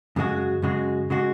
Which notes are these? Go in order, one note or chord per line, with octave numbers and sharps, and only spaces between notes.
F#2 C#3 G#3 F#4
F#2 C#3 G#3 F#4
C#3 G#3 F#4